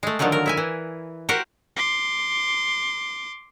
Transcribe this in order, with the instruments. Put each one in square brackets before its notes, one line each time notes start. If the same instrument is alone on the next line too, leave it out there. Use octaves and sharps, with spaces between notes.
[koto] G#3 A3
D3 D#3 F3 F#3 A3
A#4
E4 E5 G#5
E3
F#4 G4 A#4 C5 F#5
[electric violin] C6 D6